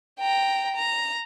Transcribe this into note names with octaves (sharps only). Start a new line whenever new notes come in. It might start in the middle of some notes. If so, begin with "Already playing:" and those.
G5 A#5
A#5